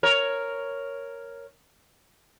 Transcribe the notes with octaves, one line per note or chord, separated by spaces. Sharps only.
A#4 C#5